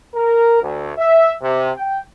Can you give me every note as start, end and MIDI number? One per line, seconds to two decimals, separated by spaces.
0.14 0.61 70
0.62 0.91 38
0.98 1.31 76
1.42 1.70 48
1.76 1.99 79